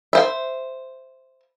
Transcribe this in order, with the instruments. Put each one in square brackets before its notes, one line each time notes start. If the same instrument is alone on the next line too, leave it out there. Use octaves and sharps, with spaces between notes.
[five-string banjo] C5 E5